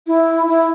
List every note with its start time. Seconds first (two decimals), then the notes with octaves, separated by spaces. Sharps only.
0.07 E4
0.47 E4